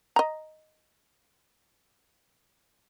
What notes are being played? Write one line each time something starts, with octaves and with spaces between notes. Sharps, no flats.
D#5 A#5